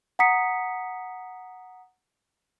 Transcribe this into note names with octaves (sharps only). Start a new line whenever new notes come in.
F#5 A#5 D#6 B6 C#7